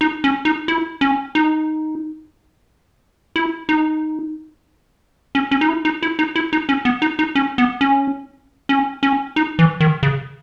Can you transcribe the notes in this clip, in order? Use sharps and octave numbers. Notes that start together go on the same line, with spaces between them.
D#4
C#4
D#4
E4
C#4
D#4
E4
D#4
C#4
C#4
D#4
E4
D#4
E4
D#4
E4
D#4
C#4
B3
D#4
D#4
C#4
B3
C#4
C#4
C#4
D#4
E3
D#3
C#3